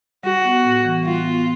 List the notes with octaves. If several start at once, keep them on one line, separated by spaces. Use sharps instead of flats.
G3 F#4
B3
A2
E3
G3 F4
B3